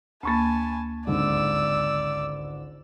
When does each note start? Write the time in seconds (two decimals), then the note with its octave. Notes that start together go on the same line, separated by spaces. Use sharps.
0.23 D2 A#3 G#5 A5 B5 C#6 A6
1.07 G#1 C#2 D3 D5 E6